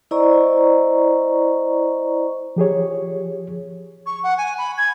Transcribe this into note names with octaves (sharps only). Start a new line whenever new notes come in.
E4 C5 D5 D#5 A#5 C#6
F3 G4 G#4 C#5
C#6
F#5
G#5
B5
G#6